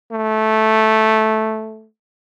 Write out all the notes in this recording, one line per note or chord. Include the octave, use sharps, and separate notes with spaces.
A3